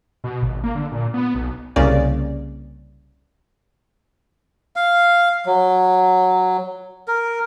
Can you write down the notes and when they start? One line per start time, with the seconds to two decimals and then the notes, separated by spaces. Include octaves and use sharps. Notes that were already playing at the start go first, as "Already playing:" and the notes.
0.24 B2
0.43 G#1
0.64 A#3
0.75 D3
0.92 A#2
1.14 B3
1.35 B1
1.76 C2 C#3 A#3 C#4 D5
4.76 F5
5.46 F#3
7.08 A#4